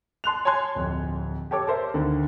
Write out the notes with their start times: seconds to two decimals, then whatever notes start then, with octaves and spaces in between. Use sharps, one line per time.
0.24 A5 C6 F#6 F7
0.45 C#5 G#5 A5 C6 F#6 G#6
0.75 D1 F2
1.51 G4 A4 C#5 D6
1.67 A4 A#4 C5 E5
1.94 D2 D3 D#3